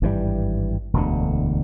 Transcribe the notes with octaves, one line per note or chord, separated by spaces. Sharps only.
G#1 G2 E3 G3
E1 D2 D3